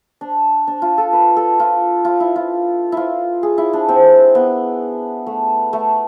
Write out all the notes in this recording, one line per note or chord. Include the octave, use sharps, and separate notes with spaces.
D4
D4
F4
A4
B4
A4
F4
F4
E4
F4
E4 F4
G#4
E4
D4
C4
B3
A3
A3